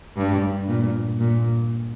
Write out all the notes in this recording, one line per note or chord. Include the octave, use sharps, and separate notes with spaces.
G2
A#2
A#2